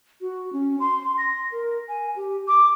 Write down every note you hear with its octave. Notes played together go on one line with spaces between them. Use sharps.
F#4
C#4
C6
A#6
A#4
G#5
G4
D6